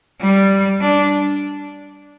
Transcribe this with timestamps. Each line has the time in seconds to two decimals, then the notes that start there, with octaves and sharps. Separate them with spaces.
0.21 G3
0.81 D4